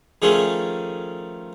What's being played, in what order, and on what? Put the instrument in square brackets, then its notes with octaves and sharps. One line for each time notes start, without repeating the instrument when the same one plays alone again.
[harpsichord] D#3 F3 A3 C#4 G#4 A4